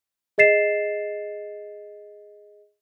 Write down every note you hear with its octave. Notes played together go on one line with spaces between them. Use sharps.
G#4 D#5 A6 C7 E7